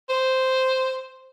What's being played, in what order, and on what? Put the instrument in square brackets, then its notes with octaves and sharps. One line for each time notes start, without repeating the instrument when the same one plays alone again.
[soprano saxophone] C5